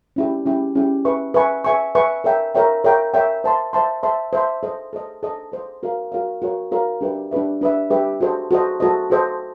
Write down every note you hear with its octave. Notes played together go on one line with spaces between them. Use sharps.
C#4 E4 G4
C#4 E4 G4
C#4 E4 G4
B4 E5 G#5 C#6
B4 E5 G#5 C#6
B4 E5 G#5 C#6
B4 E5 G#5 C#6
A#4 C#5 E5 G5
A#4 C#5 E5 G5
A#4 C#5 E5 G5
A#4 C#5 E5 G5
C5 E5 A5 C6
C5 E5 A5 C6
C5 E5 A5 C6
C5 E5 A5 C6
A4 C5 D#5
A4 C5 D#5
A4 C5 D#5
A4 C5 D#5
F#4 A#4 C#5 F5
F#4 A#4 C#5 F5
F#4 A#4 C#5 F5
F#4 A#4 C#5 F5
D4 G4 B4 E5
D4 G4 B4 E5
D4 G4 B4 E5
D4 G4 B4 E5
F#4 A4 C5 D#5
F#4 A4 C5 D#5
F#4 A4 C5 D#5
F#4 A4 C5 D#5